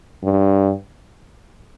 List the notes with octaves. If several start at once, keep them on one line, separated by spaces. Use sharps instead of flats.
G2